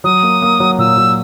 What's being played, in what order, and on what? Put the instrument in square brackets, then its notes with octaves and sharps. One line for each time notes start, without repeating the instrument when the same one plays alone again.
[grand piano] F#3 [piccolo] D#6
[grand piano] A#3
A#3
F#3
[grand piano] A#2 [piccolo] E6
[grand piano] F#3